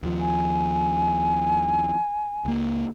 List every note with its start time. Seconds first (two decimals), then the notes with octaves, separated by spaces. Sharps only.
0.03 D#2 F3
0.20 G#5
2.45 C#2 A#3